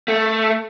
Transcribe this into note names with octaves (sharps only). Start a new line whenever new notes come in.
A3